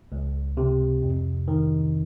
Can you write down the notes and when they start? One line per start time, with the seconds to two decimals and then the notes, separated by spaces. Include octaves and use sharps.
0.12 C#2
0.57 C3
1.02 F2
1.48 D#3